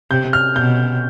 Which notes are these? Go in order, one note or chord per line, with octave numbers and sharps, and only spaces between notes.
C3 G6
F6
B2 G6